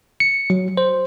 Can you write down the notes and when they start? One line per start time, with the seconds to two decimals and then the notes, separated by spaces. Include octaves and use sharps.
0.20 C#7
0.50 F#3
0.77 C5